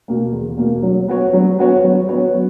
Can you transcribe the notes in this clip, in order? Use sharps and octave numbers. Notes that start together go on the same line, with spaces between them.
B2 A#3
E2
B2 A#3
F#3
B3 F#4 C#5
F#3
B3 F#4 C#5
F#3
B3 F#4 C#5
F#3